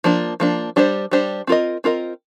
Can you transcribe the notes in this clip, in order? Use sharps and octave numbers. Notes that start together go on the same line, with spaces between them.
F3 A#3 D4
F3 A#3 D4
G3 D4 G4 C5
G3 D4 G4 C5
C4 F4 A#4 D#5
C4 F4 A#4 D#5